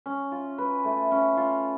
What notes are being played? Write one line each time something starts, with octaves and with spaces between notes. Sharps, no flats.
C#4
F4
B4
A3
C#4
F4